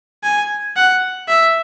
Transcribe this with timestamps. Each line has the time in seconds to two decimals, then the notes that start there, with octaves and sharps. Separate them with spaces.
0.24 G#5
0.76 F#5
1.28 E5